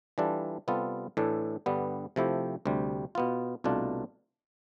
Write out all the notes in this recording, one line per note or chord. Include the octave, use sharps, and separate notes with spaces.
E3 G3 D4 F4 A4
C3 G3 B3 F4 A4
A2 E3 A3 D4 A4
G2 D3 G3 B3
C3 F3 A3 E4 G4
D2 C3 G3
B2 B3 F4
C2 B2 A3 D4 F4